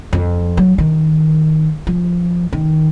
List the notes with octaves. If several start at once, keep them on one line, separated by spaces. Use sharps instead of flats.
F2
F#3
D#3
F3
D#3